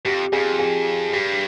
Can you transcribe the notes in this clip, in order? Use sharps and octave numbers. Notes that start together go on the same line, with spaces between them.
F#2 G4
F2
F2 G#4
G#4
G2 G4